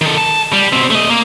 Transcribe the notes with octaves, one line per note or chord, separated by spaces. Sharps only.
D#3 A4
A5
G3
B2 C4
A3 D#5
A#3